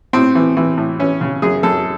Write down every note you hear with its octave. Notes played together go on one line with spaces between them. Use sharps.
A2 C4
E3
E3
A2
E3 C#4
C#3
F#2 G#4
F#2 A4